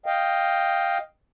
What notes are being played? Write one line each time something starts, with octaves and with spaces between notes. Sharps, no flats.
D#5 F5 G5